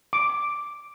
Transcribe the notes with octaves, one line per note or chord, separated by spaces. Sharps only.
D6